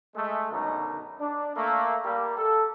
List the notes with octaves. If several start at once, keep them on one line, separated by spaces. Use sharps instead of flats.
G#3 A3
F#2 B2 D3 D#3 D#4
D4
A3 A#3
G3 A#3
A4